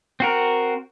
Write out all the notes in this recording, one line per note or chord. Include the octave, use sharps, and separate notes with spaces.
C4 F#4 A#4